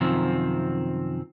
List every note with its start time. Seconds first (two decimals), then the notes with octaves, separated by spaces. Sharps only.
0.01 F#2 C3 D#3 F3 C4